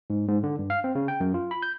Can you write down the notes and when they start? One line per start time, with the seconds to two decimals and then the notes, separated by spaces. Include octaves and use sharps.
0.10 G#2
0.28 G#2
0.43 D3
0.59 G2
0.70 F5
0.84 C4
0.95 C#3
1.08 G5
1.20 F#2
1.34 F4
1.51 B5
1.62 G6